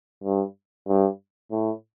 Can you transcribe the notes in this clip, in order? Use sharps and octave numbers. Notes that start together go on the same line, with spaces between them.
G2
G2
A2